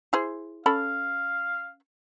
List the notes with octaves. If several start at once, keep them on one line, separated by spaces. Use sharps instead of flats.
E4 G#4 C5
C#4 A4 F5 B5